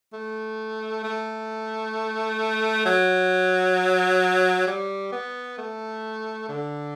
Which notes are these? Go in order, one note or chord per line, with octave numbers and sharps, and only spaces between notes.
A3
A3
F#3
G3
B3
A3
D3